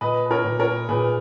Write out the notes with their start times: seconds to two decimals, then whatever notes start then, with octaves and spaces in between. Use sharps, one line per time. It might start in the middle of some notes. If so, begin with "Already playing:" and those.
0.01 A#2 B4 D#5
0.26 B4
0.31 A#4 C#5
0.45 A#2
0.59 A#4 C#5
0.89 A#2 G#4 B4